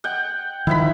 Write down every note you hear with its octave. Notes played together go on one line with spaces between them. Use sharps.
F#5 G5
D#3 F3 E4 F#5 B5